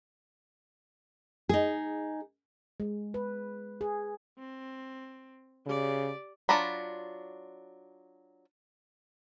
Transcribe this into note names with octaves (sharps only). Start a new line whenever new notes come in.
D#4 G#4
G#3
B4
G#4
C4
C#3 G4 D5
F#3 D4 F4 A#5 B5